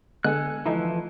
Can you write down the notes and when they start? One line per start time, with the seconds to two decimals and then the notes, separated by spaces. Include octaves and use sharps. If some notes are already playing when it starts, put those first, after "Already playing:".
0.24 D3 G#3 B3 A4 G#5 F#6
0.65 E3 F3 A3 D#4 E4